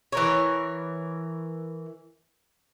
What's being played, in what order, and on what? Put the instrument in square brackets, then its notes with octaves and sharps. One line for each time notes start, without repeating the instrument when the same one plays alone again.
[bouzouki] E3 A#4 C#5